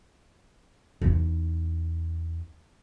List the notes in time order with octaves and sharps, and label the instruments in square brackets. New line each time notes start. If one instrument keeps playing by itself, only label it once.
[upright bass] E2 D#4